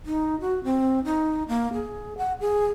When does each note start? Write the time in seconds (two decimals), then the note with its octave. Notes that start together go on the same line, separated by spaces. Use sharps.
0.06 D#4
0.41 F#4
0.64 C4
1.05 D#4
1.48 A#3
1.74 G#4
2.18 F#5
2.40 G#4